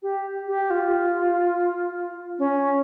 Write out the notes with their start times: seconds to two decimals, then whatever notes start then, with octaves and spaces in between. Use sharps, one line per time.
0.03 G4
0.47 G4
0.70 F4
2.39 C#4